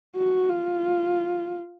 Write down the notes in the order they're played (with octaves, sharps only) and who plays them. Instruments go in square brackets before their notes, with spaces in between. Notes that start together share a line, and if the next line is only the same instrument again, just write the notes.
[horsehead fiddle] F#4
F4